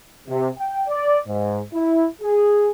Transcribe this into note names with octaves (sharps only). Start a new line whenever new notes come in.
C3
G5
D5
G#2
E4
G#4